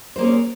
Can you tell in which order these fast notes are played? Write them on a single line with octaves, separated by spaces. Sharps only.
C5 A#3 G#4 C#4